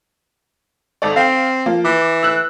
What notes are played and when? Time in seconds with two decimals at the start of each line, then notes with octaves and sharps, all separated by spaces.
1.02 G#1 A4 D5
1.16 C4 F5 G5
1.66 F3 A#3
1.85 E3 D6
2.23 E6 F#6